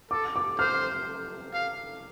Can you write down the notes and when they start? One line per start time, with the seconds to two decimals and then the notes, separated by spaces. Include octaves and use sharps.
0.11 A4 D6
0.36 D6
0.58 C5 F6
1.54 F5